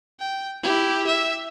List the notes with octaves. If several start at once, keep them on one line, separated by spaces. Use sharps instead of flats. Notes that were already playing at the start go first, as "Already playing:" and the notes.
G5
E4 G4
E5